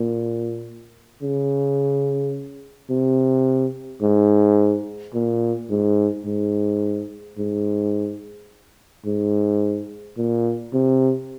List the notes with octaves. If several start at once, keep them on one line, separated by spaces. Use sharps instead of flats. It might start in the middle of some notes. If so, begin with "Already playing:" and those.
Already playing: A#2
C#3
C3
G#2
A#2
G#2
G#2
G#2
G#2
A#2
C3